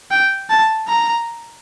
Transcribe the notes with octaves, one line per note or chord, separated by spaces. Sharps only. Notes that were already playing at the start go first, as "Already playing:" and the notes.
G5
A5
A#5